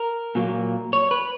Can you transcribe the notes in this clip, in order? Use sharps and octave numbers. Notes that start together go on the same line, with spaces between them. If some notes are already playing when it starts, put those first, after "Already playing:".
Already playing: A#4
A#2 F#3 A#3
C#5
B4